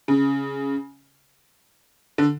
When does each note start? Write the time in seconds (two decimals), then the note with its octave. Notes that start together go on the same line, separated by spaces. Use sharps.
0.08 C#3
2.18 D3